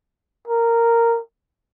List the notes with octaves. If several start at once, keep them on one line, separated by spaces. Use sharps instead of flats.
A#4